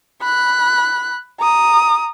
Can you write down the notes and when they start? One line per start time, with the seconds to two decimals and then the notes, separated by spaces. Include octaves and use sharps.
0.22 B5 F#6
1.40 A#5 D#6